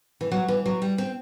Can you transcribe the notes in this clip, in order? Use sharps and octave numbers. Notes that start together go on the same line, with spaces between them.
E3
F#3
E3
F#3
G3
C4